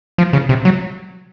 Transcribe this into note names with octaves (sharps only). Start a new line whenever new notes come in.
F3
C#3
C3
F#3